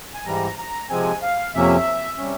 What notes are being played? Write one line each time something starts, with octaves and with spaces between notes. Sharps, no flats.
G#5
G#2 E3 G3 A#5
A#5
C3 F3 G#3 C4 G#5
F5
F2 C3 F3 A#3 C#4 E5
C3 G3 C#4